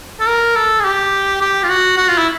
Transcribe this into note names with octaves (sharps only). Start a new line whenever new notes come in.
A4
A#4
A4
G#4
G4
G4
F4
F#4
F#4
F4
E4